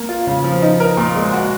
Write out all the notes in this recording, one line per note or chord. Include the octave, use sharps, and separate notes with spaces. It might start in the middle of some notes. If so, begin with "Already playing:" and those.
Already playing: A#3
F4
C#3
F3
D#4
A#4
A#2
G#3
F#4